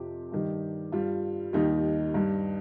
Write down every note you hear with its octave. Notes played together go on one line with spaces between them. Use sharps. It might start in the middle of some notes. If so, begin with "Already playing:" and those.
Already playing: F2 C3 F3 G4
G2 D#3 G3
G2 G3 F4
D#2 D#3 G3 D#4
G2 G3